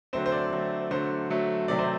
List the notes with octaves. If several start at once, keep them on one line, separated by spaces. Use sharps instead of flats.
D3 F#3 A3 C4 C5
C5
D5
D3 F#3 A3 C4
D3 F#3 A3 C5
D3 F#3 A3
C3 D#3 F#3 A3 C4 D5
C5